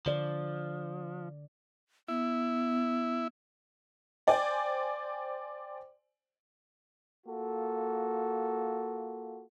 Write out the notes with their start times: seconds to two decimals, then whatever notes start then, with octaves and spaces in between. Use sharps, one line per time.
0.06 D3 F3 D5
2.08 B3 E4
4.27 C5 D5 G5 G#5
7.26 A#3 F4 F#4 A4